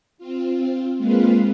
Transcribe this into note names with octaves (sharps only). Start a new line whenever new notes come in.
C4 F4
G#3 A#3 C4 F4 B4 F5